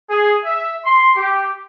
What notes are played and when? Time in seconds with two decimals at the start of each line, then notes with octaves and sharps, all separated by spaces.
0.10 G#4
0.45 E5
0.86 C6
1.16 G4